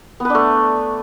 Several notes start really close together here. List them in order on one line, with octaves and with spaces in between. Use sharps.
B3 B4 D4 A3